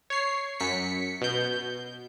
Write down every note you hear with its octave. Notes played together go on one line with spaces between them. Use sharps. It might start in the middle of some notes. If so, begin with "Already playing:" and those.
C#5 C7
F#2 B6 C#7
B2 G6